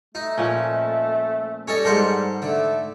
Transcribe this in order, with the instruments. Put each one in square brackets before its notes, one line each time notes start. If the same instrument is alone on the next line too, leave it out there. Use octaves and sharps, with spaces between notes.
[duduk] A3 [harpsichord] D#4
[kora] A#2 F3 C#4
[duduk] G3 [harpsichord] C#4 A4 D#5 [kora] C#5
[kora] G#2 A4 [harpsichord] A#4 C5 F#5
[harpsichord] D3 [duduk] A3